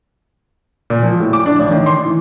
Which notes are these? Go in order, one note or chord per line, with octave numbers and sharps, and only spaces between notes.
A#2
F3
A2
D6
D4
A1
D#3
C6
E3